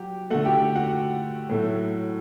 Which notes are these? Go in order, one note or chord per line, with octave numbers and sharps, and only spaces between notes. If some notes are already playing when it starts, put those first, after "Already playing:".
Already playing: F#3 G4
D3 A3 F#4 F#5
G4 G5
F#4 F#5
A2 F#3 A3